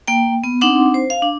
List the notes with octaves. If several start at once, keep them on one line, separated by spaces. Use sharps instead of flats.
A#3 G5
B3
C4 D4 D#4 F#5 C6 D6
C5
F5
D4